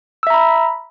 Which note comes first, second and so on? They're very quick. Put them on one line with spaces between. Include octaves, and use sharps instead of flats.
E6 E5 A#5 B5